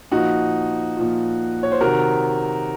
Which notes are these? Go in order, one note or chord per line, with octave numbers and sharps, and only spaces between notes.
A#2 F3 D#4 F#4
A#2 F3
C#5
C5
C3 D#3 F#4 A#4